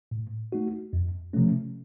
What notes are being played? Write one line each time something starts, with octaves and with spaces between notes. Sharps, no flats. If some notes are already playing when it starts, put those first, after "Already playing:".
A2
A3 D#4 F#4
F2
C3 F3 A3 C#4